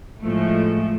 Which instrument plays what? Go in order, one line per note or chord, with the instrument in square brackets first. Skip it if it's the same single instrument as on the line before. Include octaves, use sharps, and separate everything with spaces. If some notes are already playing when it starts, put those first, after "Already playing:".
[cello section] A2 F3 G#3 A3